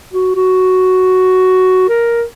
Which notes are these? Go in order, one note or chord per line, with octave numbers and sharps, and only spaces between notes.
F#4
F#4
A#4